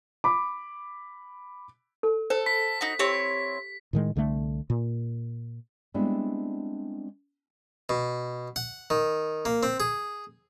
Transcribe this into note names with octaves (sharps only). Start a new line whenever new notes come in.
B5 D6
A4
A4 C5
B5 B6
D#4 F#4
C4 E4 G4 C#5
A2 D#3 G#3
C2 D3 D#3 A3
A#2
G3 G#3 B3 C4 D4 E4
B2
F#5
D#3
A#3
C4
G#4